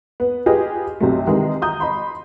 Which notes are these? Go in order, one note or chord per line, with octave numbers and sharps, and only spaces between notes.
B3
F4 G4 G#4 B4 D#5
B1 C3 F#3 A3
C3 D#3 E3 G#3
A#5 D#6 G6
D#5 B5 C6